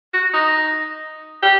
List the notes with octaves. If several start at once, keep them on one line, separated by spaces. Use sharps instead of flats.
F#4
D#4
G4